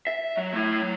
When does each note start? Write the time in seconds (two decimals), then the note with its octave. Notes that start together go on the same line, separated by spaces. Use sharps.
0.07 E5
0.37 F#3
0.53 A3 E4
0.81 F#3